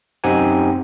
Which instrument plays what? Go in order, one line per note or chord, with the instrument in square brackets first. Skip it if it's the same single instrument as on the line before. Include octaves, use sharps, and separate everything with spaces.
[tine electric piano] F#2 C4 D#4 G4 F#5 G#5